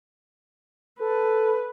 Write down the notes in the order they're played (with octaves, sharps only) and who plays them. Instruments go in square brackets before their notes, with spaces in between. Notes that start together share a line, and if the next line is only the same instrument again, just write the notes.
[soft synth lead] A4 [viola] B4